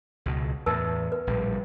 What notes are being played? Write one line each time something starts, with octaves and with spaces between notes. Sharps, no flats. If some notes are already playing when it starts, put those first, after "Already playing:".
C#2 B2
E2 A2 B4 A5 E6
B4
A#1 A2 G3